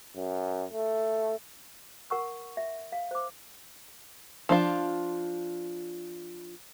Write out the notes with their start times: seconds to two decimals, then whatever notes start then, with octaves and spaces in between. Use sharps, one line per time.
0.16 F#2
0.73 A3
2.10 A#4 F#5 C#6 E6
2.57 E5
2.92 F5
3.11 C5 D6
4.49 F3 D4 F4